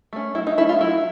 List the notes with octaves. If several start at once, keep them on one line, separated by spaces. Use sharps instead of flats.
A3 C#4
F#3 E4
D#4
A3 C#4 E4
F4
F#3 E4